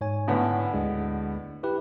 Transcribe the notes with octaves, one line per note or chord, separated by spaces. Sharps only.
G#2 C#5 G#5
A2 D3 B3
D2 G#3 D4
E4 G4 B4